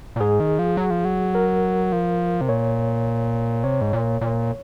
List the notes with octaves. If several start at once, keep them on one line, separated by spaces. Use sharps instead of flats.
A#2
G#2 G#4
D#3
F3
F#3
F3
F#3
A#4
F3
C3
A#2 C#5
C3 C#5
G#2
A#2
A#2